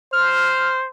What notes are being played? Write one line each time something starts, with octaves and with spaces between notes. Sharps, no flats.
C5 F6